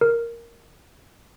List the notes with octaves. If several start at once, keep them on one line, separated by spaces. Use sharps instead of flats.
A#4